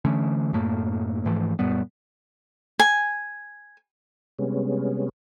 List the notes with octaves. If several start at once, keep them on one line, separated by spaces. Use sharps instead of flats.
D3 E3 A3 C#4
F#2 A2 A3 A#3
G#2 E3 F3 A3
F#2 A#2 G3 B3
G#5
C3 G3 G#3 B3 C#4